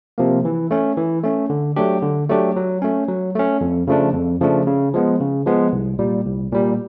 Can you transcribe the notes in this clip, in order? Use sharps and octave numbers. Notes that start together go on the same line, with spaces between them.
C3 F3 A#3
E3
A3 C#4
E3
A3 C#4
D3
F#3 A3 D4 G4
D3
F#3 A3 D4 G4
F#3
A3 C#4
F#3
A3 C#4
F2
C#3 F3 A3 D4
F2
C#3 F3 A3 D4
C#3
F3 G#3 B3
C#3
F3 G#3 B3
C2
A#2 G3
C2
A#2 G3